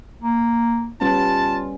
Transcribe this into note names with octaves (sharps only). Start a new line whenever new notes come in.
A#3
G3 B3 C#4 F4 A5